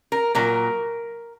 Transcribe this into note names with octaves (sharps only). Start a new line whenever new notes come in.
A#4
A#2 F#3 A#4